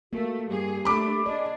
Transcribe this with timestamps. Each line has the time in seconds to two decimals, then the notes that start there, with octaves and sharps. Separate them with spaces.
0.13 A3 A#3 F#4
0.47 G2 G4 G#4
0.85 A3 D4 B5 D6
1.26 D4 G#4 D5 D#5